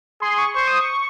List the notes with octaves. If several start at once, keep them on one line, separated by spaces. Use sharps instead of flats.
G#4 C6
C#6
C5 C#6
D#6
C#6